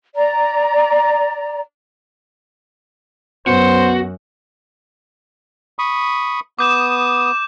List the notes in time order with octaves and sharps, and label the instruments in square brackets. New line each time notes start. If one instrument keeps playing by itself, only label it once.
[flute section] D5 A#5
[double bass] F#2 [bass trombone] B3 [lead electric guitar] F#4 [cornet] C5
[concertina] B5 C#6 D#6
[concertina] B3 D#6 [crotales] D6 G6 E7